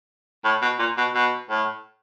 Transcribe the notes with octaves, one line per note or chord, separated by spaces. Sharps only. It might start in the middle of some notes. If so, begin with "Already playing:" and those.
A2
B2
A#2
B2
B2
A2